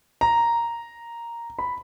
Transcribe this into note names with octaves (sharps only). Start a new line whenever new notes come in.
A#5
B5